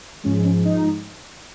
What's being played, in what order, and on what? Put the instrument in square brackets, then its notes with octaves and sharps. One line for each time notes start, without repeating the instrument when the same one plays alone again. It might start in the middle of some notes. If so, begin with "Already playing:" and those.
[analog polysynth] G#2 F3 G#3 C#4
C#4
D#4